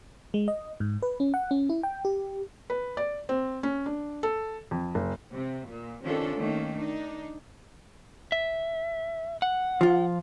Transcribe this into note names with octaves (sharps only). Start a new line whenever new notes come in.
G#3
D#5
G#2
B4
C#4
F#5
C#4
E4
G5
G4
B4
D5
C4
C#4
D4
A4
F2
F#1
C3
A#2
C3 D#3 C#4 D4 F4 A4
D#3 A3 A#3 C#4
D4 D#4
E5
F#5
F3 F4